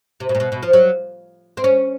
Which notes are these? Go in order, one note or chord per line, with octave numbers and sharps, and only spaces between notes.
C3
B2
A#2
B2
B2
F3
F#3
C4
C#4